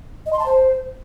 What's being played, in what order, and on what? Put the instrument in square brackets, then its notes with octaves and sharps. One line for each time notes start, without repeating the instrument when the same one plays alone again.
[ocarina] D#5
C6
A5
C5